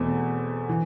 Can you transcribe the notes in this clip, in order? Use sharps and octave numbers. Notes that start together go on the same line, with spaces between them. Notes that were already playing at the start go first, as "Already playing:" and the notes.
Already playing: E2 B2 A3 C4
E3